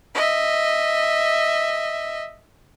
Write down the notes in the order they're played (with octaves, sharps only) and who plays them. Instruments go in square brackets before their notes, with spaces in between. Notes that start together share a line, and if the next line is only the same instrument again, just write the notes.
[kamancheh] D#5 E5